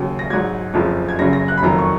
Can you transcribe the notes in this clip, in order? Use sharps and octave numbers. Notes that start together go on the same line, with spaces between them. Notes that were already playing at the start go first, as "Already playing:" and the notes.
Already playing: D#2 C#3 F#3
A#6
G#1 G#2 F#3 G#6
F#1 F2 F3 G#3
G#6
F#1 F#2 C#3 F#3 A#6
A#6
F#6
B5
F#1 F2 D#3 F#3 A#5
C#6